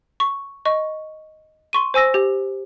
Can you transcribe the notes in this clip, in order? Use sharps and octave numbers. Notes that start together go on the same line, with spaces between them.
C#6
D#5 C#6
C6 C#6 D#7
C5 G#5 E6 A#6
G4